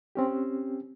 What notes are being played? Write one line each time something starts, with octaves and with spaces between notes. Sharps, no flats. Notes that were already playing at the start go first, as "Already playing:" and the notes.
C4 C#4 G4